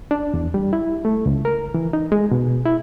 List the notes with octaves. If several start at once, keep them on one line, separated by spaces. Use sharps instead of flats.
D4
E2
G3
E4
A3
C#2
A#4
E3
D#4
G#3
B2
E4